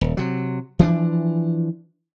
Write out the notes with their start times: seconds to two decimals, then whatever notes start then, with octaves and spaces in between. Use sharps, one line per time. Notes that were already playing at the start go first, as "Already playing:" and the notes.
0.01 D#1
0.17 C3 F#3
0.79 E3 F3 C4 D4